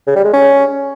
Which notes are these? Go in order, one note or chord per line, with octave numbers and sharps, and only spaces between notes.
C#3
G3
G#3
C#4